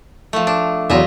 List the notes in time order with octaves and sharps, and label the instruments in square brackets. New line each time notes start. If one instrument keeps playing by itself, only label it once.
[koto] F3 A3
D4
[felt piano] E2 F#3 [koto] F4 D#5 E5